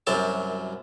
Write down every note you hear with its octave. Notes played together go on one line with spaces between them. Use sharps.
C2 F#2 F#3 A#4 A5 D6